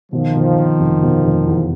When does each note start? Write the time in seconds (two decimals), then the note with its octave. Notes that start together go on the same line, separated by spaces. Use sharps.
0.12 B2 D#3 F3
0.35 B2
0.57 B2
0.80 F1
1.02 B2
1.24 F1
1.47 E2